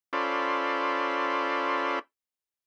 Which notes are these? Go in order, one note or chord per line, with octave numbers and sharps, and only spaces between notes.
C#4 F4 A4 C5 D5 B5